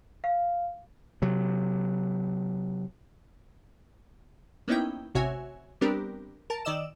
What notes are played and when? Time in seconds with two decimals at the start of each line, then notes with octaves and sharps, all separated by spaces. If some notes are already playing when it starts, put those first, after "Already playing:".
0.24 F5
1.22 C3 F#3
4.68 A#3 B3 C#4 D#4 E4 G5
5.14 A1 C3 F#4 C#5 E5 G#5
5.81 G3 B3 C4 D4 G4 A#4
6.50 A#4 A5
6.65 D#3 D5 D#5 E6 E7